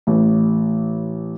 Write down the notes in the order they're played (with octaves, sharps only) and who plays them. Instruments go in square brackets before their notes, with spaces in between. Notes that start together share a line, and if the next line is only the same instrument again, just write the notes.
[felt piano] A1